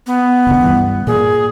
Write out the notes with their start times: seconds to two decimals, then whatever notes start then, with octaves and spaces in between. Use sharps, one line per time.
0.07 B3
0.47 F1 C#2 D3
0.62 G2 E3
1.07 A#2 G#4